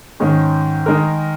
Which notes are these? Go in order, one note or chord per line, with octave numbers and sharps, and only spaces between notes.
G#2 D#3 G#3 C#4
D#3 G#3 D#4 A#4